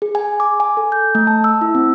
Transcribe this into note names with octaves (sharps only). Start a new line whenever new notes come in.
G#4
G#5
D6
G#5
A4
G6
A3
A5
E6
E4
C4